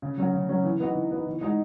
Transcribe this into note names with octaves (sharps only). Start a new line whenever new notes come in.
C#3
F#3 C#4 F#4
C#3
F#3 C#4 F#4
E3
B3 D#4 F#4
E3
B3 D#4 F#4
E3
G#3 D#4 F#4